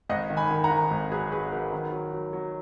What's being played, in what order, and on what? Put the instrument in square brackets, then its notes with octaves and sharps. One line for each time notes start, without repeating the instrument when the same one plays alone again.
[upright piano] G#1 D#5 F#5
D#3
G#5 B5
D#3
F#5 A#5
D#3
G#1
F#3 G#4 B4
F#3 G#4 B4
F#3 A#4
D#3
F#3
F#3
F#3